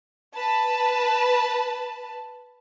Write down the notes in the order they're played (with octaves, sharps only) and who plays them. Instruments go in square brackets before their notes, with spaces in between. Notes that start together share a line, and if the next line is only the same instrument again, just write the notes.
[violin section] B4 A5